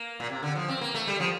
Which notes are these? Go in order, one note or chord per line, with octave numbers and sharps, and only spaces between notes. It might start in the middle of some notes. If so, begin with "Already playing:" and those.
Already playing: A#3
A#2
C3
D3
F3
C4
A#3
A3
G3
F3